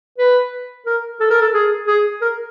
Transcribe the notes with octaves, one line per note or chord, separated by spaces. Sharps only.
B4
A#4
A4
A#4
A4
G#4
G#4
A#4